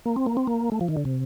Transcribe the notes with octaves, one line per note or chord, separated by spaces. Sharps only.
A#3
C4
A#3
C4
A#3
A3
F3
D#3
D3
C3